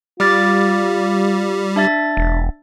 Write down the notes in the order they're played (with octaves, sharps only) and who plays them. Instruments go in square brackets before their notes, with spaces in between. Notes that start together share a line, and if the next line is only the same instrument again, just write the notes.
[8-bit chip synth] G3 [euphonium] F4 [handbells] D6 F6 A6
[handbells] D4 E5 A6
[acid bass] E1